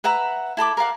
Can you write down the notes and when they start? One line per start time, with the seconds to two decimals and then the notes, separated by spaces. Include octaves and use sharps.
0.04 B4 E5 F#5 A#5
0.57 E4 A4 B5 D6
0.77 A#4 D5 F5 F#5